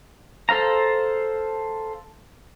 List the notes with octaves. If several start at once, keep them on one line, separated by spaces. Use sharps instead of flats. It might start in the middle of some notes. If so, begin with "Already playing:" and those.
A4 C5 F5 A#5